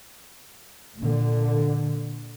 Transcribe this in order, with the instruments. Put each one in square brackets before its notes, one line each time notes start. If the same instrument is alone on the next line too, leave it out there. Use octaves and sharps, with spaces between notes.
[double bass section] A#2 D3